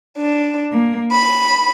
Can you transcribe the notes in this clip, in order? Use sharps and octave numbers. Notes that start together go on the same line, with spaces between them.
D4
A#3
B5